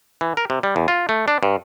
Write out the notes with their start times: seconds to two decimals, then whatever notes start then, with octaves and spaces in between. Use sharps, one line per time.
0.21 E3
0.37 A#4
0.50 C3
0.63 G3
0.76 E2
0.88 F4
1.09 A3
1.28 D4
1.43 G2